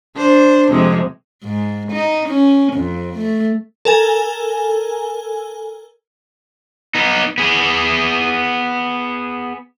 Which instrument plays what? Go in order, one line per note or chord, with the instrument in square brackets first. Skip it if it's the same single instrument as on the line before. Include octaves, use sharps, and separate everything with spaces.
[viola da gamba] D4 C5
F2 C3 G#3
G#2
D#4
C#4
F2
A3
[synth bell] A4 A#4 G#5
[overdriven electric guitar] B3 D#4
B3 G#4